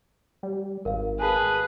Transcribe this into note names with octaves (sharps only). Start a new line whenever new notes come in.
G3
G#1 A#4 F5
G#4 B4 G#5 A5